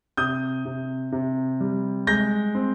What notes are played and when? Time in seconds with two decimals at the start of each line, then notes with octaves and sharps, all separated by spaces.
0.17 C3 D#6 G6
0.65 C3
1.12 C3
1.60 G3
2.07 G#3 G6 A#6
2.55 C4